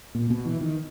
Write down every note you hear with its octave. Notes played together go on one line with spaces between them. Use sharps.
A#2
B2
E3
D#3